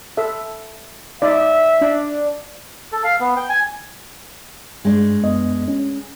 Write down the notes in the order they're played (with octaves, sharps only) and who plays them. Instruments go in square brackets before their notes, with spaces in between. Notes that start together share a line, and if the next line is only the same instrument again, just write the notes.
[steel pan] A4 E5
[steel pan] D#4 D5 [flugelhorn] E5
[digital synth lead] D4
[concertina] A4
F5
B3
G5
G#5
[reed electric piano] G2 [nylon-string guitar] G#3 A3 D4
[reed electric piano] F#2 B3 D#5
C#4